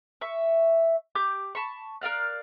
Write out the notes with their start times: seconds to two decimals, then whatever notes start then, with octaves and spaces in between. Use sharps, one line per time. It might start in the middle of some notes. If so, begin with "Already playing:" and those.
0.21 E5 C#6
1.15 G4 D6 G6
1.55 A5 B5 C#6
2.01 A#4 D5 F5 F#6